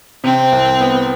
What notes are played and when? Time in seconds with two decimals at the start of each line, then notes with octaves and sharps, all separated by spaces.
0.24 C3 C4
0.52 C2
0.80 B3